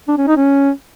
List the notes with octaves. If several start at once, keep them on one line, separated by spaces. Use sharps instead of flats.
D4
C#4
D#4
C#4